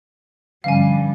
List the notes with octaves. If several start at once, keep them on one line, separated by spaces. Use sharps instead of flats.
G2 D3 F3 G3 C#4 F5 G#5